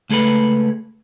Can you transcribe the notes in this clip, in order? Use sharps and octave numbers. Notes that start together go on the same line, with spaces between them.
C#2 A3 G#4 A4 B4